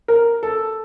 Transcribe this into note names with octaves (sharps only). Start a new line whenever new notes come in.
A#4
A4